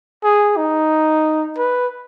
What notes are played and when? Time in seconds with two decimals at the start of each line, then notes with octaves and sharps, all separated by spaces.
0.24 G#4
0.57 D#4
1.58 B4